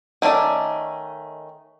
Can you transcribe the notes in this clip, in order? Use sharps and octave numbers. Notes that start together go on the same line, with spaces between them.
D#3 A3 C#4 D5